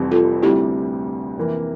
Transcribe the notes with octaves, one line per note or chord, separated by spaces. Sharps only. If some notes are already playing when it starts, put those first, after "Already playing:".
Already playing: F1 F2 E3 G3 C4
F4 A4
D2 C3 G3 E4 G4
F2 C3 E3 A#3